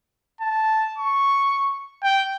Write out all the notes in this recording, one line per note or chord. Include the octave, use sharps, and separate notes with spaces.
A5
C#6
G5